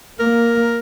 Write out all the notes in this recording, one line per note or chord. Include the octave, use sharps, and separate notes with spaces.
A#3 A#4